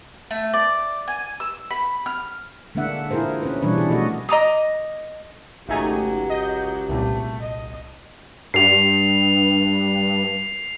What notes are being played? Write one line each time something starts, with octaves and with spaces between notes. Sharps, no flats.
A3
D5
G#5
E6
B5
F6
D3 G#3 A#3 D4 E5 F#5
E4 F4 G#4 A#4 C5
C#4 B4
B2 E3 G3 D4 B4 C#5
G#4
B2 F3 A3 F#4 A4 D#5
D#5 A#5 D6 D#6
G#1 C#2 F#3 A3 D#4 G4 G#4 G#5
D#5 G6
C2 A#2 A3
D#5
G2 C7 F7